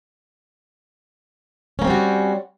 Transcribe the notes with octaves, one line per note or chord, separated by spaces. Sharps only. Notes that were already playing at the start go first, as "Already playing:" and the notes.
G3 A#3 C4 C#4 F#4